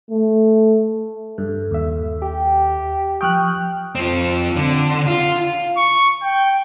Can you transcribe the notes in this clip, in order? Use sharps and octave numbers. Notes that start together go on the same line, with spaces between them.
A3
G2 A4
D#2 E5
G4 G5
F3 G5 C#6 D#6 F6 F#6
F3 C4
D3
F4
C#6
G5